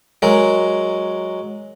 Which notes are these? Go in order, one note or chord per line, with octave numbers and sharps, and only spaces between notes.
F#3 G#3 A#4